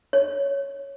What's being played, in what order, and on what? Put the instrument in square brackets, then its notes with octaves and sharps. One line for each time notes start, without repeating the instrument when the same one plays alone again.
[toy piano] C#5